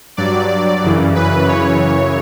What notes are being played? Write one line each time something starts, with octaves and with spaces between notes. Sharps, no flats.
G2 F#3 D5
F#2 C#3 E3
B4
F#2 C#3 E3 C#5